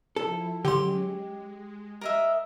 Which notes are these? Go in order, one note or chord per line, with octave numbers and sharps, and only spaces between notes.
F3 E4 A4
D3 F#3 G#3 C#4 G4 C6
G#3
A#4 D#5 E5